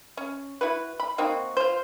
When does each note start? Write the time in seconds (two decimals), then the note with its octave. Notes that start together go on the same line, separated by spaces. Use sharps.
0.17 C#4
0.61 E4 F#4 B4
1.00 B5
1.18 A#3 C4 D#4 F#4
1.57 F4 C5